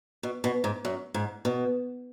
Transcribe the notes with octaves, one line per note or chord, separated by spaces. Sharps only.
B2
B2
G#2
F#2
G#2
B2